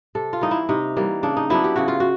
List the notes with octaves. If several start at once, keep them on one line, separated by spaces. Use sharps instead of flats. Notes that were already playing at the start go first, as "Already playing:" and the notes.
C3 A4
F4
E3 G3 A#3 D#4
E4
C3 D#4
E3 G3 A#3
C#3 D4
D#4
F#3 B3 D4 E4
G4
C#3 F#4
F4
F#4